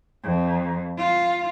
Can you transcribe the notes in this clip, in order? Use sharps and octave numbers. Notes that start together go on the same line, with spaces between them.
F2
F4